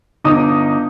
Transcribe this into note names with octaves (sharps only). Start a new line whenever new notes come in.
G1 D#4 D6 D#6